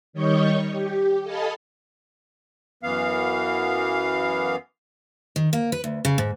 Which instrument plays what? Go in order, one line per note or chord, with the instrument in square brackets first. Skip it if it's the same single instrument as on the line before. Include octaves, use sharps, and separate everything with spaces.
[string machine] D#3 G3 C#5 D#5 C#6 G6
G4
A4 D#5 F5 G#5 A5 B5
[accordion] F#2 E3 B3 F5
[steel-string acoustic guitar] D#3
A#3
B4
D2
C#3
G#2